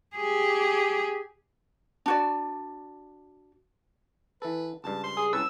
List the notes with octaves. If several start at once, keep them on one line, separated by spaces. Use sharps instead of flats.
G4 G#4
D4 F#4 D5
E3 A4 B4
C#2 G2 A5
C6
G#4
C2 C#4 B4 A5 E6